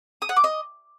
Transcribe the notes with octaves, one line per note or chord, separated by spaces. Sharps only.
D#6
F#5
D6
D#5